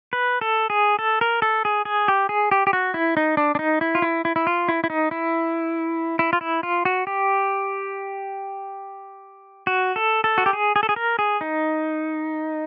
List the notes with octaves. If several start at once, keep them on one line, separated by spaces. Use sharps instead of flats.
B4
A4
G#4
A4
A#4
A4
G#4
G#4
G4
G#4
G4
G4
F#4
E4
D#4
D4
D4
D#4
E4
F4
E4
E4
E4
F4
E4
E4
D#4
E4
E4
F4
E4
F4
F#4
G4
F#4
A4
A4
F#4
G4
G#4
G#4
A4
G#4
A#4
G#4
D#4